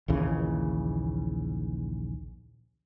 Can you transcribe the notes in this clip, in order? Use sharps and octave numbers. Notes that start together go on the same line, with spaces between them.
A#1 D#2 C#3 E3